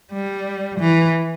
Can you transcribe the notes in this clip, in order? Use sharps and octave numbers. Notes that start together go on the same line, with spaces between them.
G3
E3